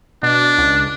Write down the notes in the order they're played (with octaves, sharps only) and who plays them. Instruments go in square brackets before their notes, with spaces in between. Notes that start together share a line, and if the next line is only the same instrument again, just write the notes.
[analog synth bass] B2 [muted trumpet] D4
[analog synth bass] C#2